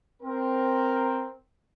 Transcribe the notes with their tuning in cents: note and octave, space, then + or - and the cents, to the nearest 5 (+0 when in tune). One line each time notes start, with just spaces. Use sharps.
C4 +0 A#4 +0